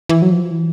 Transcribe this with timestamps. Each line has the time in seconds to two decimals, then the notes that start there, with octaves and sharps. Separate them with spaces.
0.09 E3
0.22 F#3
0.31 F3
0.51 E3